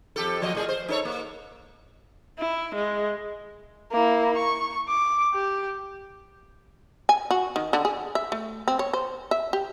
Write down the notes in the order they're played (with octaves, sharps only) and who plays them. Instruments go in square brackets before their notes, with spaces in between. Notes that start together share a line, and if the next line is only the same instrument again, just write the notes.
[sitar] F2 G4 A4
A#2 F3 D#5
A2 G#4
C5
D#4 A4 C#5
A#3
[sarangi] E4
G#3
[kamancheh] A#3 E4
C#6
D6
G4
[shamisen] G#5
F#4
D#3
D3
G#4
E5
A3
C4
C#5
C5
E5
G4